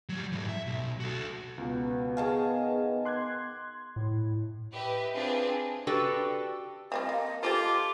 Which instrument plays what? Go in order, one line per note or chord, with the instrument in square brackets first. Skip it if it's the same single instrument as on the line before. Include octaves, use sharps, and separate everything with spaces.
[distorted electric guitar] F#3 G3
G#2 E3
E5
B1
F#4 A4
[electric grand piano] C#2 B2 [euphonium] B3
[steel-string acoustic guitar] G#2 D#3 G#3 [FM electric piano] G#4 F5 [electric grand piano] G#5 A5 C#6
[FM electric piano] C6 G#6 [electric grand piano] D6 F#6
[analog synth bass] A2
[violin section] G4 B4 D#5 E5
C4 D4 F4 G#4 B4
[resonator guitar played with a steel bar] D4 F#4 G4 A4 B4
[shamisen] G3 C4 F4 [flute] D#5
[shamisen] A#3
[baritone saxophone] F4 [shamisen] G4 A4 C5 [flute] D6
[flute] D6